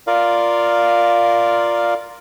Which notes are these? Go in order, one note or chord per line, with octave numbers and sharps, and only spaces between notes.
F4 A#4 D5 F5